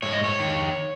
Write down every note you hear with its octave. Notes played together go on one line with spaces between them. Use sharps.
G#2 C#5
D#5
C#5
D#3